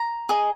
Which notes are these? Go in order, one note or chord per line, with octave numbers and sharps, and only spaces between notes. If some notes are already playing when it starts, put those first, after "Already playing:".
Already playing: A#5
G#4 D#5